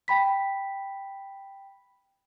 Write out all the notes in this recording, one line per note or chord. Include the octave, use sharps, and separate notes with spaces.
G5 B5 B6